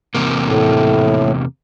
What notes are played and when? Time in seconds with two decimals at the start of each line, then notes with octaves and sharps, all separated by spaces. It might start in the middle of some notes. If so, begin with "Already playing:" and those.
0.15 E2 C3 A#3
0.45 A2